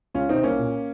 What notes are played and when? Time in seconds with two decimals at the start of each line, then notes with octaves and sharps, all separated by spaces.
0.15 C#2 C#4 F4
0.29 C3 D#3 C4 D#4
0.43 C2 A#3 C#4
0.58 A#2